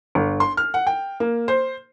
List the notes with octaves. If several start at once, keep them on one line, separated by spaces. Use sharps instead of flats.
G1
C6
F6
F#5
G5
A#3
C5